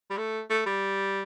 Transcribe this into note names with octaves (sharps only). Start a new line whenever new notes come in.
G3
A3
A3
G3